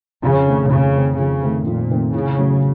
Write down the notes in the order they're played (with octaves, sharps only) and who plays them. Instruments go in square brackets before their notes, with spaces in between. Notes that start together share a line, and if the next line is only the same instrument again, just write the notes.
[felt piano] F2 [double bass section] C#3
[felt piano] D#3 A3 C4
[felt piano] F2 [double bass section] C#3
[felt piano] D#3 A3 C4
[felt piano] F2 [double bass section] C#3
[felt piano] D#3 A3 C4
[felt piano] F2 [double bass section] A#2
[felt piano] D#3 A3 C4
[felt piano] A2 [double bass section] C#3
[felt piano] F#3 A3 C#4